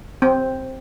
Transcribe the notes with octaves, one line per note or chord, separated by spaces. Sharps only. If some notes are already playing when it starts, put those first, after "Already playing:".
C4